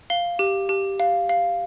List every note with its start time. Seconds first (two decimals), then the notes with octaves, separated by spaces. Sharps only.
0.10 F5 G7
0.39 G4
0.69 G4
1.00 F5
1.29 F5